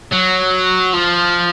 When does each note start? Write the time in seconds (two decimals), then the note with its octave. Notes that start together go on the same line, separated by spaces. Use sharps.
0.12 F#3
0.93 F3